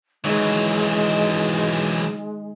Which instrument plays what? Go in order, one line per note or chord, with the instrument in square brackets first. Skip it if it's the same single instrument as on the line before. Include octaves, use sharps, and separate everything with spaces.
[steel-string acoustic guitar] D#3 D#4 D#5 [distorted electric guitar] E3 F#3 [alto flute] G#3